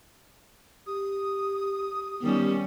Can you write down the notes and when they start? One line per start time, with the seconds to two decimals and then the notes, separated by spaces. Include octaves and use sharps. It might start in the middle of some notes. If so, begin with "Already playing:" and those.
0.87 G4 D#6
2.22 D#3 G3 B3 C#4 G4